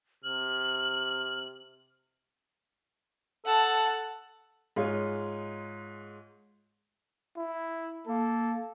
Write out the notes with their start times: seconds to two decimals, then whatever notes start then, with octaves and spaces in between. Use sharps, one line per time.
0.24 C3 F6 F#7
3.46 A4 F#5 A5
4.76 G#2 G#3 F4 C#5
7.37 E4
8.07 A#3 A4